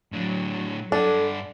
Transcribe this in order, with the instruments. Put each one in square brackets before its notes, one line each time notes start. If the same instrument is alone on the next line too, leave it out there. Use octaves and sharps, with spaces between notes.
[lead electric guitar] A2 D4 [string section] F#3
[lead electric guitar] G2 F#5 [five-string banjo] D4 [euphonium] A4